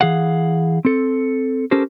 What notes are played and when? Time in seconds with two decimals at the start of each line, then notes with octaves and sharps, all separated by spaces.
0.01 E3 G#4 F5 F#5
0.85 C4 A4
1.71 C#4 G4 A4 A#4 C5